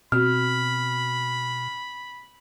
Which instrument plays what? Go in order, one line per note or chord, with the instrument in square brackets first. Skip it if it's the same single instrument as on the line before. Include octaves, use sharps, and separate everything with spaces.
[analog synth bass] B2 [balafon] C4 F#4 [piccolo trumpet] B5 [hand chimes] F6